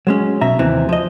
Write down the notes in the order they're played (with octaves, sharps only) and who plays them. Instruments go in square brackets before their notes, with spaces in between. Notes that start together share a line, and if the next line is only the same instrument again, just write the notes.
[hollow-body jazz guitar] F#3 G#3 C#4
B1 B2 E5 A#5
D#2 C3 E3 C4
F3 D#5